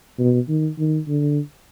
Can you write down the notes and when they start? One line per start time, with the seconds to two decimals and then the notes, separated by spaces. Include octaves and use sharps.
0.19 B2
0.48 D#3
0.78 D#3
1.08 D3